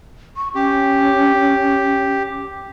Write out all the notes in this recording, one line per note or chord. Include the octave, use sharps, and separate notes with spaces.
C#6
C#4 G4